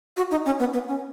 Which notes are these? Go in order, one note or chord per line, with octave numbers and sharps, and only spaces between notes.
F#4
D#4
C#4
B3
B3
C#4